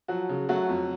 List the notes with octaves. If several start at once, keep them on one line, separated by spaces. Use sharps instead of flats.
F3 F#3 F#4
C#3
F#3 A3 F#4
F2